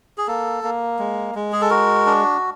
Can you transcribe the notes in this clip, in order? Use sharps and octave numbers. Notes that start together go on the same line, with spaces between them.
G#4
A#3 A4
A#3
G#3
G#3
G#4
A4
F#4 A#4
D4